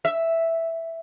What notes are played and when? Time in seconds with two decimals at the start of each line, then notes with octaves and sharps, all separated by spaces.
0.05 E5